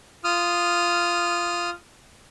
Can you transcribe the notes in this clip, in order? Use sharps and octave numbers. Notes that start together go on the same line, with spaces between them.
F4 D#6 F6